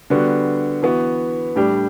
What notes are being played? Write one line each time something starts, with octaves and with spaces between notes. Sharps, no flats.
D3 G3 B3 F#4
E3 B3 F#4
A2 G3 D4 G4